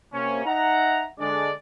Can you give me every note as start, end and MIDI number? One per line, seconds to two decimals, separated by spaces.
0.13 0.42 48
0.13 0.42 58
0.13 0.42 61
0.45 1.05 63
0.45 1.05 76
0.45 1.05 78
0.45 1.05 82
1.19 1.51 50
1.19 1.51 56
1.19 1.51 62
1.19 1.51 74